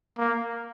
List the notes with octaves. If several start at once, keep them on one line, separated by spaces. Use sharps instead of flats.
A#3